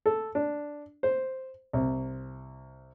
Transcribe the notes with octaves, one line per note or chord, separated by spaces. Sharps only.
A4
D4
C5
C2